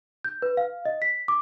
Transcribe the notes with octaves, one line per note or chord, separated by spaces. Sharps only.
G6
B4
F5
D#5
B6
D6